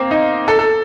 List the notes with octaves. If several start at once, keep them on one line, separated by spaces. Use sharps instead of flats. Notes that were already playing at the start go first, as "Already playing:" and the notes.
Already playing: A#3 C4
D#4
A4
A4